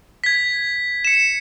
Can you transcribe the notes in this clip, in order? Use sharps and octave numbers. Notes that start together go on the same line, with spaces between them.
G#6 B6
C#7 E7